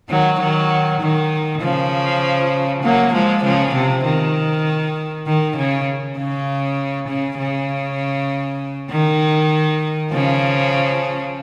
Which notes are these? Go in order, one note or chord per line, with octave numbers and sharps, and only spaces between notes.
D#3 F#3
D#3 F#3
D#3
C#3 F3
F#3 A#3
F3 G#3
C#3 F3
C3
D#3
D#3
C#3
C#3
C#3
C#3
D#3
C#3 F3